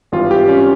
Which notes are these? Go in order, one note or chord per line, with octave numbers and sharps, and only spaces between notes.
G#1 G2 E3 G3 F4
G4
C#4